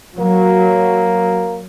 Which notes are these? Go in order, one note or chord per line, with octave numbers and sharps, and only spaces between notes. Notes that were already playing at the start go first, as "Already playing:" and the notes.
F#3 A#3